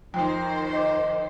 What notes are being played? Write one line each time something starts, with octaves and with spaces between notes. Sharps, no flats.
F2 D#3 D#4 C5
D#5 D6